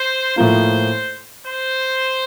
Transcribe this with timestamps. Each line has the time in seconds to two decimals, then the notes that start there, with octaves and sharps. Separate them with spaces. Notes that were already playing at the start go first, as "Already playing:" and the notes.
Already playing: C5
0.36 A2 F3 A#3 F4 C5
1.45 C5